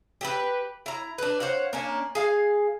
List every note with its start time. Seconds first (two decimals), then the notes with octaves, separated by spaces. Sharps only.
0.21 G4 G#4 B4
0.86 E4 A#5
1.18 D4 B4
1.40 C5 C#5 F5 F#5
1.73 A#3 C#4 D4
2.15 G#4 F5 G#5